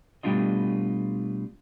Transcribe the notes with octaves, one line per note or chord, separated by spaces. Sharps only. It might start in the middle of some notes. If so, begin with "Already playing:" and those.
B2 G3 A3 D4 F4 D#5